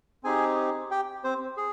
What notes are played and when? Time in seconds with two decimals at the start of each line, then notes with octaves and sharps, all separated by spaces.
0.23 C4 D#4 G4 G#4 G#5
0.91 G4 G5
1.24 C4 C5
1.57 G#4